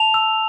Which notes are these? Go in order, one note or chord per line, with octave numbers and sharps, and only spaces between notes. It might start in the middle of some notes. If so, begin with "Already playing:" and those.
Already playing: A5 F7
E6